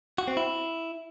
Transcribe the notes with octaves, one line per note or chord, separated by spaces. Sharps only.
F#4
C4
E4